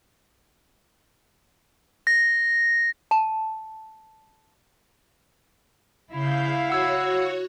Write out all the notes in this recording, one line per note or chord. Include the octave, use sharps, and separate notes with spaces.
A#6
A5
C#3 E4 F5 G6
F#4 C#5 F#5 E6 G#6